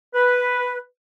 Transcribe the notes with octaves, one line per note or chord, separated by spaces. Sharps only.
B4